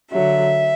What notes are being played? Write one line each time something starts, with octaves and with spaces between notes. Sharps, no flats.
D3 F#3 E5